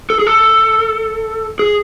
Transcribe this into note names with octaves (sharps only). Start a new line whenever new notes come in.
A4
G#4
A4
G#4